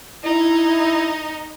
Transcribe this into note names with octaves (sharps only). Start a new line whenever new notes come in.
D#4 E4